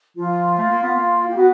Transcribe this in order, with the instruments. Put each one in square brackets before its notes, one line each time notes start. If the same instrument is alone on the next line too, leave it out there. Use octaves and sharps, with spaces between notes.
[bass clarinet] F3 [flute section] F4
[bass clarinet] A3
A#3
B3
A#3
[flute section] G4
[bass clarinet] B3 [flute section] F#4